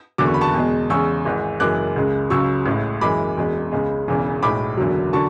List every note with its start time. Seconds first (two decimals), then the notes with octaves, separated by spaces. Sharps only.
0.18 F#1 E2 D3 F#3 D6
0.26 C#6
0.34 B5
0.41 A5 C#6
0.54 E2 B2 G#3
0.90 E2 C#3 G#3 C#6 E6
1.25 G#1 G#2 E3
1.60 F#1 F#2 E3 G#3 D6 F#6
1.96 C#2 C#3 G#3
2.30 C#2 C#3 F#3 C#6 E6
2.66 A1 A2 G#3
3.01 F#1 F#2 E3 G#3 B5 D6
3.37 E1 E2 B2 G#3
3.72 C#2 C#3 G#3
4.08 E1 E2 C#3 E3
4.42 B1 A2 G#3 B5 D6
4.77 F#1 E2 D3 F#3
5.13 D3 F#3 A5 C#6